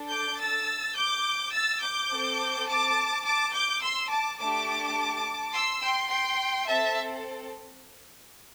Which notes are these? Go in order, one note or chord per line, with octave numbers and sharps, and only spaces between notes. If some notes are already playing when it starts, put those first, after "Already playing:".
Already playing: D4 A4
D6 G6
E6 A6
D6 G6
E6 A6
D6 G6
C4 A4
A5 D6
A5 D6
D6 G6
C6 E6
A5 D6
A3 D4 G4 A5 D6
C6 E6
G5 C6
G5 C6
C4 A4 E5 A5